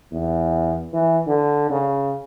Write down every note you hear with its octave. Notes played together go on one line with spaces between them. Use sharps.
E2
E3
D3
C#3